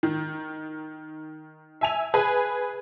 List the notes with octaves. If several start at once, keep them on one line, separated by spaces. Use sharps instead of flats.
D#3
E5 G#5 F7
G#4 B4 G#5